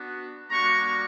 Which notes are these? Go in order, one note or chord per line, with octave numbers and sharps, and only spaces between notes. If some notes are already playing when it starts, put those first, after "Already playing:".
Already playing: B3 D4 F#4
G3 A#3 D4 F#4 A#5 C#6